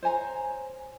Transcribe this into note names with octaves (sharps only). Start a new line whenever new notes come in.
C5 C#5 G#5 A#5